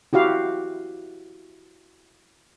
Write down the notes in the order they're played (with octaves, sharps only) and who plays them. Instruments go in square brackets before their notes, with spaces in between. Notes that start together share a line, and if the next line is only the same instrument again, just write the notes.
[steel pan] E4 F#4 G4 F5